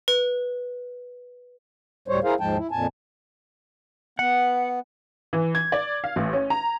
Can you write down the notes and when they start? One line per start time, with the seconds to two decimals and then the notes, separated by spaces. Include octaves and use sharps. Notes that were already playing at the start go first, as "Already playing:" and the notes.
0.08 B4
2.08 D2 A2 G3 C5 C#5
2.24 E4 G#4 A#4 C5 F5
2.40 D#2 G#2 F3 G#3 G5 A5
2.57 E4
2.71 F2 A#2 G#5 A5
4.19 B3 F#5
5.33 E3
5.55 G#6
5.72 D5
6.04 F5
6.16 A1
6.33 C#4
6.50 A#5